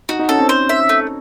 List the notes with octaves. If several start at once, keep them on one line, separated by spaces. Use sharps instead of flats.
D#4 F#4
D#4
C#4 A4
C4
C5
E5
A3